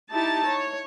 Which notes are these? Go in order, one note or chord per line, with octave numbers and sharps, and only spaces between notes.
D#4 E4 G4 A5
C#5